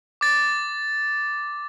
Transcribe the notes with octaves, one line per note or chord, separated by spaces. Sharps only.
D6 A6